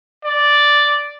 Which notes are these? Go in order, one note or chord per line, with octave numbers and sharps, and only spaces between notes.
D5